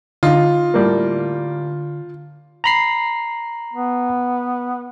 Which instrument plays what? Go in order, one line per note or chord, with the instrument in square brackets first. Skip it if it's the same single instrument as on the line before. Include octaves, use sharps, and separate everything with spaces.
[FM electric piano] D3 [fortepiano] D#4 [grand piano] F4
[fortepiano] A2 G3 A#3
[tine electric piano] A#5 B5 C7
[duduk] B3